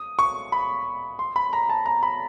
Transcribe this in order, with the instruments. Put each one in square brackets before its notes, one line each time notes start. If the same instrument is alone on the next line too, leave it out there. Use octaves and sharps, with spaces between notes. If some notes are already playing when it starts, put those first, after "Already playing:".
Already playing: [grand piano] D#6
C#6
B5
C6
B5
A#5
A5
A#5
B5